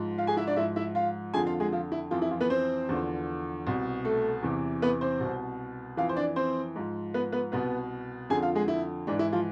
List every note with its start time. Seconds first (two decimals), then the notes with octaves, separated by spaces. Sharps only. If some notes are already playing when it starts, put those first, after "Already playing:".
Already playing: G#2 F3
0.18 F4 F5
0.27 G#4 G#5
0.37 E4 E5
0.47 D4 D5
0.56 G#2 F3 E4 E5
0.76 E4 E5
0.95 F4 F5
1.34 F2 D3 F3 G#4 G#5
1.46 F4 F5
1.60 G#3 G#4
1.72 F3 F4
1.92 E4
2.11 F2 E3 F3 F4
2.22 E4
2.31 F3 F4
2.40 B3 B4
2.50 C4 C5
2.89 E2 D3 F3
3.67 C2 B2
4.05 A3 A4
4.43 E2 C3 E3
4.82 B3 B4
5.01 C4 C5
5.20 C2 B2
5.97 F2 E3 F4 F5
6.09 C5
6.17 D4 D5
6.36 C4 C5
6.76 G#2 F3
7.14 B3 B4
7.32 B3 B4
7.52 C2 B2 B3 B4
8.30 F2 D3 F3 G#4 G#5
8.42 F4 F5
8.55 G#3 G#4
8.68 E4
9.07 G#2 E3 D4
9.19 E4
9.33 F3 F4